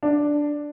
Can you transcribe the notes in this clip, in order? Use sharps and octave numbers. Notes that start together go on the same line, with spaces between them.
D4